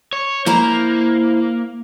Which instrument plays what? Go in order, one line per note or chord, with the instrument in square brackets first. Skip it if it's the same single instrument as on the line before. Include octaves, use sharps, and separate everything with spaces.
[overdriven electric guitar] C#5
[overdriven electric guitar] A#3 [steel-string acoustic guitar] E4 C5 A#5